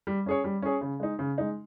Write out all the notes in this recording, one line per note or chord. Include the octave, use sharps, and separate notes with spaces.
G3
C#4 G#4 C#5
G3
C#4 G#4 C#5
C#3
G#3 D#4
C#3
G#3 D#4